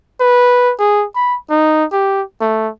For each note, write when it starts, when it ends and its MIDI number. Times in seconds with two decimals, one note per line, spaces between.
0.20 0.73 71
0.79 1.05 68
1.16 1.37 83
1.50 1.85 63
1.92 2.22 67
2.41 2.69 57